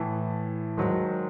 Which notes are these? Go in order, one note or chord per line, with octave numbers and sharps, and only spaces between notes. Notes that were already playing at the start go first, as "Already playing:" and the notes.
Already playing: A2 E3 A5
G#2 D#3 F#3